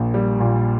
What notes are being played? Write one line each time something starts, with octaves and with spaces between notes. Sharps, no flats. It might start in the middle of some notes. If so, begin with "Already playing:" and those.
Already playing: A#1 A#3
G3
A#2